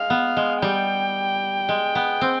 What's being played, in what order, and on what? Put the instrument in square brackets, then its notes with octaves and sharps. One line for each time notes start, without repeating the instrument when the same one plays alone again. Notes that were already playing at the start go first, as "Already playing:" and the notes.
Already playing: [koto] G#3 [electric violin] F5
[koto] B3
G#3
[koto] G3 [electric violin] G5
[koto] G#3
B3
C4